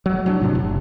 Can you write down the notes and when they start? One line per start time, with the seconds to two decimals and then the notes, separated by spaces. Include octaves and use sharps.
0.06 F#3
0.26 F#3 C4 D4
0.41 A2 C3 D4
0.55 F#1